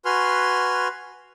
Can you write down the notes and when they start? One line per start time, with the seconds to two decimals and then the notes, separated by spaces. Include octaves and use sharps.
0.05 F#4 B4 G#5 C6 F6